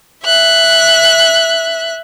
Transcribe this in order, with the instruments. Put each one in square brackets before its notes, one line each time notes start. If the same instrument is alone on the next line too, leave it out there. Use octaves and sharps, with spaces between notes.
[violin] E5 F#6